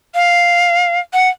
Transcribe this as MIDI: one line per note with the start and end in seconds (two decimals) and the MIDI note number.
0.15 0.99 77
1.13 1.29 78